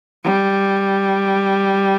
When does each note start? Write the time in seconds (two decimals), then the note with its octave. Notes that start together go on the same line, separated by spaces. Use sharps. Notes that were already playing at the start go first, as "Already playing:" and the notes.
0.24 G3